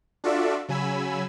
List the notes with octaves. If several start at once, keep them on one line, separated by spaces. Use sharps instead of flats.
D4 F4 F#4 A4 D5 E5
C#3 F#3 G#5 B5 E6